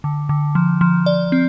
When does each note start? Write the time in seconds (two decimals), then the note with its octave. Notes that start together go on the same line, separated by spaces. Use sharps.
0.04 D3
0.29 D3
0.55 F3
0.81 F3
1.06 D5
1.32 C4